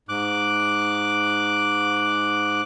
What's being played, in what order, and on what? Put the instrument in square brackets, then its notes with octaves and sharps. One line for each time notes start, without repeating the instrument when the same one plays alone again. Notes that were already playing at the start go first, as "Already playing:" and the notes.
[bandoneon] G#2 D6 F#6